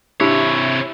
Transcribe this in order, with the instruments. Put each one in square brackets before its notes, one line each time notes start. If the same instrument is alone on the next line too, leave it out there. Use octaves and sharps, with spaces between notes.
[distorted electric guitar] C3 C#5 [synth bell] D4 G4 [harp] E4